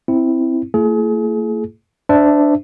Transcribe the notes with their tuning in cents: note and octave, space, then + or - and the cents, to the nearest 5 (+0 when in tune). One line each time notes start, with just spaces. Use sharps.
C4 +0 E4 -5
A3 +45 E4 +45 G#4 +35
D4 +0 C5 -30 E5 +0